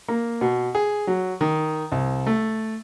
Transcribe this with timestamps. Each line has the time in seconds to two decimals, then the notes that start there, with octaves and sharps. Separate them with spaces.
0.08 A#3
0.41 B2
0.75 G#4
1.07 F#3
1.41 D#3
1.92 C2
2.27 A3